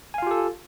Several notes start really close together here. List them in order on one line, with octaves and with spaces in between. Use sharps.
G#5 F5 F4 G4 A4